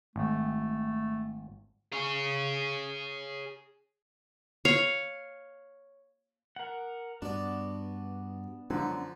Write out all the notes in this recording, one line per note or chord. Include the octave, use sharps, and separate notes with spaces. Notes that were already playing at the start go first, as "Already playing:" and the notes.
G#1 A3
G#4 C#5
C#5 F5
A#4 F#5
G2 B3 D4 F#4 D5
F#2 D3 F3 C#4